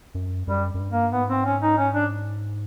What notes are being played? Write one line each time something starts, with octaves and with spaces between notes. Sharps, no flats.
F#2
F#2 G3
F#2
G2
A#3
G#2 B3
C4
C#4
D#4
C#4
D4